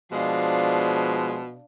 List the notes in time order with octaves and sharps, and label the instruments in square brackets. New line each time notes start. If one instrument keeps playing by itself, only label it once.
[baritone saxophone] B2 [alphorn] F3 [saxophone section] G#3 [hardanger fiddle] D4 F5